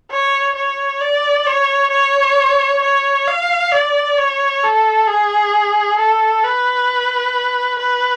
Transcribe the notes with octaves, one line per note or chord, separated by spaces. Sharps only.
C#5
C#5
D5
C#5
C#5
C#5
F5
D5
C#5
A4
G#4
A4
B4
B4